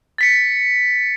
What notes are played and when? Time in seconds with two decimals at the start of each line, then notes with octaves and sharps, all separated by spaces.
0.18 A6 B6 C#7